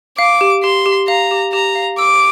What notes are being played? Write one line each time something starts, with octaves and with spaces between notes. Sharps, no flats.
F5 D6
G4
G4 C6
G4
F5 A#5
G4
G4 A#5
F5
D6 E6